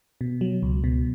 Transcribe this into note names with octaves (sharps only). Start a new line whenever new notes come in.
B2
F#3
C#2
B2